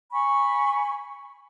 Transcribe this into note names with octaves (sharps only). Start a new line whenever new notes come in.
G#5 B5 C#6